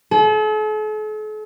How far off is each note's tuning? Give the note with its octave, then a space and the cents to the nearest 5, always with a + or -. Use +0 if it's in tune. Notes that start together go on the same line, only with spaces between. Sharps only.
A4 -45